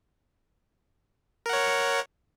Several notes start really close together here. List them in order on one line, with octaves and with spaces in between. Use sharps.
A#4 F#5 C#5